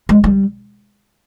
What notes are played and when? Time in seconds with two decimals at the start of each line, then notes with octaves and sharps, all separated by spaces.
0.09 G#3
0.24 G3